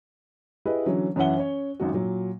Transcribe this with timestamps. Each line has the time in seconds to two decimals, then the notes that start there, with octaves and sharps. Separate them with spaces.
0.66 E4 G4 G#4 B4 D#5
0.86 D3 E3 F#3 C#4
1.16 F#2 E3 C#4 E5 F#5 G7
1.37 C#4 C#5
1.80 G#1 F#2 F#4
1.93 A#2 F#3